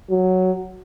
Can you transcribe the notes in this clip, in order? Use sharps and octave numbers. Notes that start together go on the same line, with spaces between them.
F#3